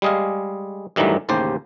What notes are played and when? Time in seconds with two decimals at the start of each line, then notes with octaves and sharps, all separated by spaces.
0.02 G3 G#3 G#4 D#5 F5
0.96 G2 D#3 E3 F#3 G3 A3
1.29 A1 D#2 C#3 G4 C5 A5